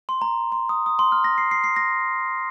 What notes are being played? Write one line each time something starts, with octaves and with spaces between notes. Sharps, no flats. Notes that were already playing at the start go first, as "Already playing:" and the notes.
C6
A#5
C6
D#6
D#6
C6
F6
A#6
C7
C7
C7
A#6